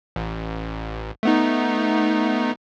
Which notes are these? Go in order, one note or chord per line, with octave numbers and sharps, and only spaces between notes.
A1
A3 B3 D#4